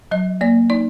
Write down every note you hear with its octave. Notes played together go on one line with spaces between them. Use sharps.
F#3 D#5
A#3 D5
D#4 D5